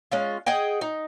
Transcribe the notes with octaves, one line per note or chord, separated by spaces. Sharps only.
G#3 C#4 F4
G#4 D#5 F#5 G5
D#4